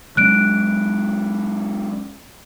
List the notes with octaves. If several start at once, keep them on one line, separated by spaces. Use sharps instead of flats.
F#3 G#3 C#4 F#6 D7